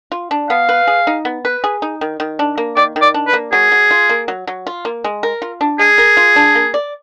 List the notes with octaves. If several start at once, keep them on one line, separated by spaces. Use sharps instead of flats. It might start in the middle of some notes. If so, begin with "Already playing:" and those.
F4
D4
B3 F5
B4
G#4
D#4
B3
B4
G#4
D#4
D#3
D#3
D4
A#3
D#3 D5
D#3
D5
D4
B4
A#3
F#3 G#4
F#3
F4
A#3
F#3
F#3
F4
A#3
G#3
A#4
F4
D4
G#3 G#4
A#4
F4
D4
A#3
D5